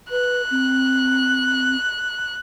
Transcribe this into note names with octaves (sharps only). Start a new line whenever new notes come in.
B4 F#6
C4